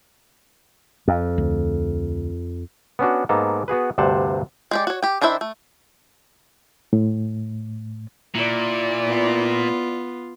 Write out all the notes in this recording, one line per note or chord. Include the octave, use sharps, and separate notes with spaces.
F2
D2
B3 C#4 D4 F#4
G#2 A#3 B3 A4
B3 F#4 G#4 B4
D2 G2 C3 C5 F#5 A5
G#3 G4 D5
F#4 C#5
G4 G5
D#3 D4 E4 C5 E5
A3
A2
A#2 E4 D5
B3 F4